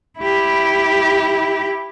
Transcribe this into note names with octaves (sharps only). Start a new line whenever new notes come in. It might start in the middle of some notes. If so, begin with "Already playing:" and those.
E4 G4